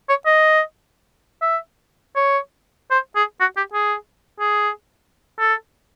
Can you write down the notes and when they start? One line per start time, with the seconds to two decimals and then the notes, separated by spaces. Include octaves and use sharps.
0.09 C#5
0.26 D#5
1.42 E5
2.16 C#5
2.91 C5
3.16 G#4
3.40 F#4
3.57 G4
3.73 G#4
4.40 G#4
5.39 A4